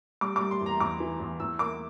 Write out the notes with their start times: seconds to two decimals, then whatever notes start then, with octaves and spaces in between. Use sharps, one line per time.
0.21 G3 D6
0.36 G3 D6
0.51 C6
0.61 E2
0.66 A#5
0.80 E2 D6
1.00 E3
1.20 E2
1.40 E2 E6
1.59 A#3 D6